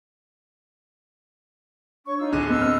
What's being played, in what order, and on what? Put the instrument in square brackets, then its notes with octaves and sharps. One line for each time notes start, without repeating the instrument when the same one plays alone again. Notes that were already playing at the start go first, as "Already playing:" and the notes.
[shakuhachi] D4 [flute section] C#5 C#6
[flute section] D#4 F4 E6
[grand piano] D1 D3 D#7 [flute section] G#4 D6
[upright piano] B3 [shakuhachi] C4 [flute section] D#5 E6 F#6
[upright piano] F6